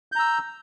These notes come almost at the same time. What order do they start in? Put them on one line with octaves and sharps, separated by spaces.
G6 A#5 E6